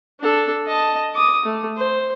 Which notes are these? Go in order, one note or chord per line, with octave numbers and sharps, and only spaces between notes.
D4 A4
D#5 A5
D6 D#6
A3
C5